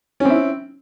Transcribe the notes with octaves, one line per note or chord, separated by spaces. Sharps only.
C4 C#4 E4